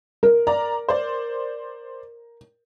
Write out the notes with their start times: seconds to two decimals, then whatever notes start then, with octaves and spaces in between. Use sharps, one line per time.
0.23 A#4
0.47 D5 A#5
0.89 C5 D5